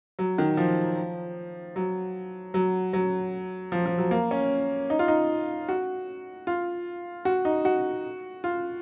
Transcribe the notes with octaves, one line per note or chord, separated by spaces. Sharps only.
F#3
D#3
F3
F#3
F#3
F#3
F3
F3
F#3
A#3
C#4
D#4
F4
D#4
F#4
F4
F#4
D#4
F#4
F4